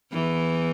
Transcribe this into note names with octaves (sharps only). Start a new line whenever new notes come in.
E2 E3